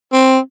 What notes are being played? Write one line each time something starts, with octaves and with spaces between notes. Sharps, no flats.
C4